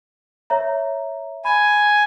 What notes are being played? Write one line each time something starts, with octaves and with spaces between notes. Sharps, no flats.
C#5 E5 A#5
G#5 B5